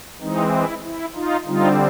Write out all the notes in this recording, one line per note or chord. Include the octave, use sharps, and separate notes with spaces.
E3 G#3 C4 D#4
E4
E4
D#4 F4
D3 G3 C4 D#4 F4